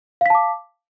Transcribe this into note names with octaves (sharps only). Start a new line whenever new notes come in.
F5 A5 D6 B6